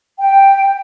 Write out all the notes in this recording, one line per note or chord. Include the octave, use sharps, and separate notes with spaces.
G5